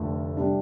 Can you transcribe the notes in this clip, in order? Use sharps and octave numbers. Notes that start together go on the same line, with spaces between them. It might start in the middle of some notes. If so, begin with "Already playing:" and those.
Already playing: F1 F2 D3 A3
C3 G3 D4